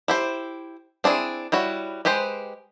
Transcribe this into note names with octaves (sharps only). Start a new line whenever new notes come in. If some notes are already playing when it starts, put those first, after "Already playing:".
E4 G4 C5
C4 D4 E4 G#4
G3 E4 F#4 C#5
G#3 G4 B4 C5